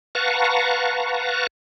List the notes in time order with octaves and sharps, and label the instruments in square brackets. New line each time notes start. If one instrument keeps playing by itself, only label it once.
[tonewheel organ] B4 F5 F#5 A5 A#5 C#6